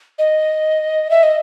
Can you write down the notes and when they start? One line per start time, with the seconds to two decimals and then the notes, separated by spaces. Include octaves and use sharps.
0.19 D#5
1.10 E5
1.23 D#5